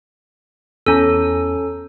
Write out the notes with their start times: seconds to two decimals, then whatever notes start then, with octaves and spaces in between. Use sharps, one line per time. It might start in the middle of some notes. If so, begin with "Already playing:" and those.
0.86 E2 C#4 A4 A#5